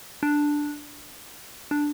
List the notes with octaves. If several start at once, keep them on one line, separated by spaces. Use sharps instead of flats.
D4
D4